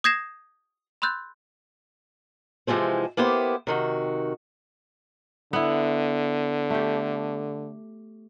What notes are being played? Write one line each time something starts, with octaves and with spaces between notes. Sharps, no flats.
D#6 G6 G#6 A#6 C7 E7
B5 C6 E6 F#6 G6 A6
C3 E3 F3 G#3 C4
A#3 B3 E4 G4 C5
C3 D#3 F#4
D3 B3 E4
A3 G4